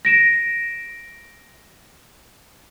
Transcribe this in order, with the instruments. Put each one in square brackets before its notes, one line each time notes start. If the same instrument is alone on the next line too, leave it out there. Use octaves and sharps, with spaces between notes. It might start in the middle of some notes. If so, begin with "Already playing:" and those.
[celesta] A#6 D7 E7